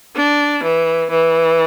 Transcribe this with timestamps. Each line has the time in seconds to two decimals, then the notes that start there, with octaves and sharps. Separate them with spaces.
0.15 D4
0.63 E3
1.10 E3